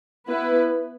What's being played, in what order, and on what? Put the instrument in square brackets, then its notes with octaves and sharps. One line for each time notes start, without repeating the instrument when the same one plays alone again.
[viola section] B3 E4 B4